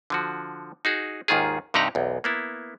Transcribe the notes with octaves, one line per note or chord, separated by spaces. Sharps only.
D3 F3 F#4
D#4 F#4 G#4
D#2 G#2 D#3 F4 G#4
G2 C3 D#4 G4 F#5 A#5
B1 E2
A#3 B3 E4